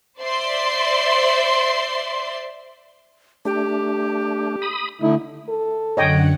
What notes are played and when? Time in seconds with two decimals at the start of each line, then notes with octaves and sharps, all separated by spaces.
0.20 C5 D5 E5 C6
3.45 A3 D4 G4
4.62 B5 D#6
5.01 D3 A3 D#4 E4
5.49 A4
5.97 F#2 D3 C#5 D#5 F#5 G5